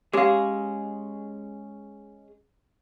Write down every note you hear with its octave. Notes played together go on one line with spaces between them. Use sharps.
G#3 C#4 G4 G#4 F5